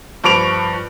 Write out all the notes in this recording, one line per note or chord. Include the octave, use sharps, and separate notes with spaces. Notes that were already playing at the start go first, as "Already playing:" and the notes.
G2 F3 B5 C#6 D7 F7